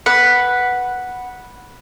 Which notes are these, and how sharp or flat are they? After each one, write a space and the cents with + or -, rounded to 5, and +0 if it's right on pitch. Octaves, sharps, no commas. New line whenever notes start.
B4 -5 F#5 +0